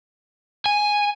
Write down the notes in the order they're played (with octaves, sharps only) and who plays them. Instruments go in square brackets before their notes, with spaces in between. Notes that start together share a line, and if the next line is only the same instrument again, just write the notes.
[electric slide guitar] G#5